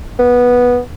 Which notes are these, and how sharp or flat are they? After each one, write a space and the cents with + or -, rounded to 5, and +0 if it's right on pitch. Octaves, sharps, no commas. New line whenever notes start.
B3 -10